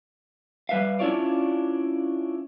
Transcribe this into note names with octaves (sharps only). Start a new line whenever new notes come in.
G3 B4 E5 F5
C#4 D4 E4 F4 C#5 D5